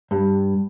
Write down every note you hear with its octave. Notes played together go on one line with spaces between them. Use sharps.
G2